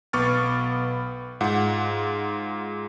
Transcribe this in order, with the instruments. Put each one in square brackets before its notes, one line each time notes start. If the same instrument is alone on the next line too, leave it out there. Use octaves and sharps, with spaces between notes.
[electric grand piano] B1 B3 C#6 D6 F6 A6
G#2 F4 F#5